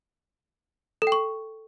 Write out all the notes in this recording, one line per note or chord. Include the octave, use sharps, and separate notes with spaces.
A4
G5
C#6